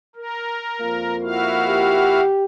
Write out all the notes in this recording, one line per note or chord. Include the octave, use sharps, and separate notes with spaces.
A#4
F2 A#3 F4
E4 F#4 F5
G4